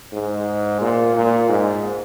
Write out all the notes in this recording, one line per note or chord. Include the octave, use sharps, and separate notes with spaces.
G#2
A#2
A#2
G#2